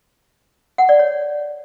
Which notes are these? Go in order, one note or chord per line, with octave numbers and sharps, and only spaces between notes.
F#5
D5
C#5